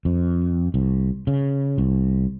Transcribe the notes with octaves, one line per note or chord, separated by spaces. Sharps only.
F2
C2
C#3
C2